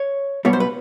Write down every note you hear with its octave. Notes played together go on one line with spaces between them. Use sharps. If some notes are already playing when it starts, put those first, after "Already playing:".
Already playing: C#5
B1 B2 G3 B3 C#5
C5
B4